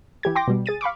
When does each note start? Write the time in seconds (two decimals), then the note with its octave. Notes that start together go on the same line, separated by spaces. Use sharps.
0.23 E3 G4 G#6
0.35 G5 C6 D6 A#6
0.47 B2 G3
0.66 G#4 A6 D#7
0.81 F5 B5 C#6 D6